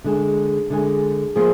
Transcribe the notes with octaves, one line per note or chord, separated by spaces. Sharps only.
D3 G#3 D4 G#4
D3 G#3 D4 G#4
F3 A#3 F4 G#4 C5